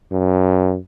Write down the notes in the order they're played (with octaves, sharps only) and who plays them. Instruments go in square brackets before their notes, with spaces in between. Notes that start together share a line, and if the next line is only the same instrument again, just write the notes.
[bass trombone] F#2